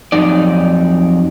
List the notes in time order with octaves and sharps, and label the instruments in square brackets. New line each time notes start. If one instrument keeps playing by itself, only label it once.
[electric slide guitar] F2 F#3 D#4 D5